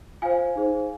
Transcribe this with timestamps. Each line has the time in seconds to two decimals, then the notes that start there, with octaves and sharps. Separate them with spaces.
0.22 F4 C5 F5 G#5
0.55 D#4 G#4 C5